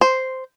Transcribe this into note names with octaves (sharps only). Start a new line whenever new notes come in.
C5